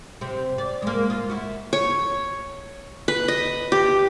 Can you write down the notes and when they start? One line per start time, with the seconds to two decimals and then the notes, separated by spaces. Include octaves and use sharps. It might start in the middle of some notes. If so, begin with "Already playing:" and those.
0.21 C3 C4
0.58 D5
0.82 G#3 A#3
1.10 F4 D#5
1.29 E4 F#4
1.73 C#5
3.08 B4
3.28 D#5
3.72 G4